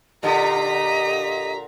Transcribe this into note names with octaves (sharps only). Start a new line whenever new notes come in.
A#2 D3 G4 D#5 A#5 B6